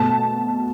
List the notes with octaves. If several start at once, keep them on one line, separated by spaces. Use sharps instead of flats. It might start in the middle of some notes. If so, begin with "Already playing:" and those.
Already playing: B2 A3 A5